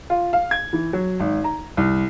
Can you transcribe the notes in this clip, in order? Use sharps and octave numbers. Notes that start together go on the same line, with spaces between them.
F4
F5
G#6
E3
F#3
G#1
A#5
C2